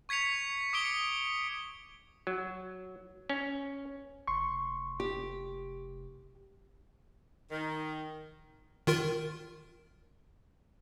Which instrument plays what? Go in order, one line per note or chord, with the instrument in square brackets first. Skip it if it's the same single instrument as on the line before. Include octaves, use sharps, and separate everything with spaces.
[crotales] C#6 G#6 B6 C#7 F7
D6 D#6 C#7 D7 G7
[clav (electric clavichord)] F#3
C#4
[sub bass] F1 [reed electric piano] C6 C#6
[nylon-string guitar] G4
[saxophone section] D#3
[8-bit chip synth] D#3 F4 A#4